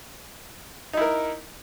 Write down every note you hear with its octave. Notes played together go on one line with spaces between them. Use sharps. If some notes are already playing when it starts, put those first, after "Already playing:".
D#4 E4 A#4